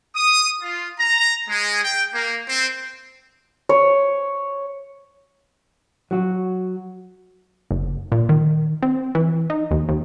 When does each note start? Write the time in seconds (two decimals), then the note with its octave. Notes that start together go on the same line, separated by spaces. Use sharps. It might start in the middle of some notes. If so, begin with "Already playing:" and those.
0.16 D#6
0.61 F4
0.99 A#5
1.49 G#3
1.83 G5
2.14 A#3
2.47 C4
3.69 C#5
6.11 F#3 F#4
7.71 F#1
8.12 A#2
8.29 D#3
8.83 C4
9.15 E3
9.50 D#4
9.71 D#2
9.89 D#2